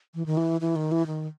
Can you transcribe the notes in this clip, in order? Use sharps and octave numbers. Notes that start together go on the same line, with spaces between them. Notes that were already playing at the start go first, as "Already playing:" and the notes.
E3
D#3
E3
E3
D#3
E3
D#3